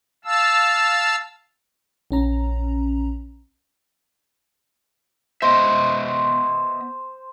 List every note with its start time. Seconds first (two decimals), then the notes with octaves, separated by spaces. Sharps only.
0.25 F5 A5 E6
2.11 A#1 C#4 A#5
5.42 B3 C5 D#5 E5